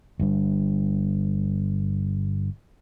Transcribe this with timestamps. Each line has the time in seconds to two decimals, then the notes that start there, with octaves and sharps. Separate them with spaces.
0.19 G1 G2